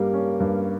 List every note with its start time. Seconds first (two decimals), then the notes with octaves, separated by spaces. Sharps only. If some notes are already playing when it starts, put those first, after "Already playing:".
Already playing: G2 G3 A#3
0.14 C#4
0.40 G2